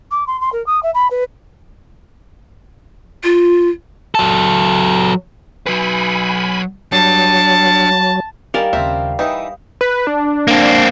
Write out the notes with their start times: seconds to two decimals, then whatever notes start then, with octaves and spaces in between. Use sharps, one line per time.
0.11 D6
0.27 C6
0.40 C6
0.52 A#4
0.66 D#6
0.82 E5
0.94 B5
1.10 B4
3.24 F4
4.15 F#3 A4
5.67 F#3 B4 G#5 B5
6.92 F#3 G3 D4 A5
8.54 D#3 G3 A#4 F5 G#5 A5
8.73 D#2 C#3 C4 F4 E5
9.19 E3 D#4 E4 G5 B5 D#6
9.81 B4
10.07 D4
10.48 A#3 C4